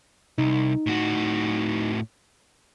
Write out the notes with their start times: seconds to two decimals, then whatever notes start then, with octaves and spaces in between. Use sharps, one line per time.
0.38 C2 D#4
0.87 A2 F#4